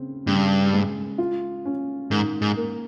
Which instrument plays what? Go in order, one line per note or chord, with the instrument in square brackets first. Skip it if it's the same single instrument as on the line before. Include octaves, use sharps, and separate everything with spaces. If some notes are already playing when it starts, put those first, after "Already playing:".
Already playing: [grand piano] C#3 C4
[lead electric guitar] G2 [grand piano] C#3
[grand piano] G#3
F4
C#4
[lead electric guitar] G#2 [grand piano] D#3
[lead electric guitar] G#2
[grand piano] A#3